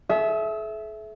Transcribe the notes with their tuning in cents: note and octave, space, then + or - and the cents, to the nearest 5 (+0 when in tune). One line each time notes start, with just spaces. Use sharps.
A4 -45 E5 +0 D#6 +40